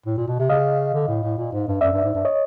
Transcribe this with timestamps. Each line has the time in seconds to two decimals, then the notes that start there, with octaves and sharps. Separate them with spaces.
0.06 A2
0.17 A#2
0.28 B2
0.39 C3
0.50 C#3 D#5 F5
0.94 D3
1.08 A2
1.23 A2
1.38 A#2
1.52 G#2
1.67 G2
1.81 F#2 D5 E5
1.93 G2
2.04 G#2
2.14 G2
2.25 C#5 D#5